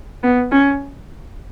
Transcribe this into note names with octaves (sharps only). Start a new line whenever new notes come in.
B3
C#4